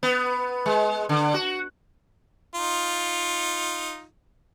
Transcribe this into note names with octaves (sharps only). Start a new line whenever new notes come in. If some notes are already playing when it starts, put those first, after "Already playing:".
B3
G#3
D3
F#4
D#4 F4